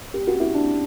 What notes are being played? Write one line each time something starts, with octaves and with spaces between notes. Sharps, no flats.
G4
F#4
E4
D4